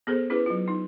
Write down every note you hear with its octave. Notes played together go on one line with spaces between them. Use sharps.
B3 G#4 A4 C5
C#4 E4 G#4 B4
F#3 F4
D#4